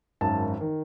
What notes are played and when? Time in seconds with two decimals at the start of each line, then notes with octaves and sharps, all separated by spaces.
0.21 G#1 F#2 D#3 A5
0.61 D#3